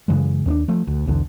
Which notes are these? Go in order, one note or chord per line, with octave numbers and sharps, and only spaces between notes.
F#2 C#3 E3 G#3
D#2 C4 D4
F3 A3
D2
B1 E2 D3